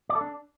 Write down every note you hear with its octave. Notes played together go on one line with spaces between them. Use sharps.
D5
A4
D4